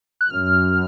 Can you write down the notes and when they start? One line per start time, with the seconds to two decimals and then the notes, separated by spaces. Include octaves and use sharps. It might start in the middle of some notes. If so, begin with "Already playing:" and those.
0.21 F#6
0.30 F#2 F6